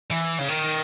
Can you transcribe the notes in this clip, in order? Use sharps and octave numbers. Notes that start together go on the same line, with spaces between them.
E3
C#3
D#3